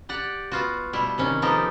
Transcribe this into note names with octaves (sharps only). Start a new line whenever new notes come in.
G4 D5 F#5
B3 F4 F#4
B2 G3 E4
C3 D#3 C#4
F3 B3 D#4 G4 A4 A#4